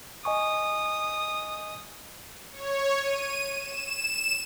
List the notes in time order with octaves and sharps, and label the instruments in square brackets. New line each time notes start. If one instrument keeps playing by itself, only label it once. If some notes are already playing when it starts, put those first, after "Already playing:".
[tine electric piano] D#5 G#5 C#6 [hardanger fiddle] D#6
[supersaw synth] C#5
D#7
E7